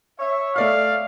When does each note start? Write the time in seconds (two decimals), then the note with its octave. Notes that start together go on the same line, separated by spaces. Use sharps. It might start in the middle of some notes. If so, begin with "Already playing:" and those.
0.20 C#5 E5
0.56 A3 D5 F5 F6